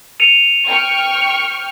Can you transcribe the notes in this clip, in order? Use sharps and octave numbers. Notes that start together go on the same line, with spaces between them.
C#7 D#7 F7
G5 C#6 F6